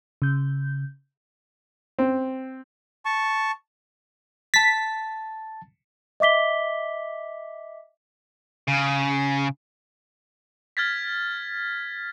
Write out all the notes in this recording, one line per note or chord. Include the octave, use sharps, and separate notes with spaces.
C#3 G6
C4
A5 C#6
A5 A6 B6
D#5 E5 D6 B6 G7
C#3
F6 G#6 A6 B6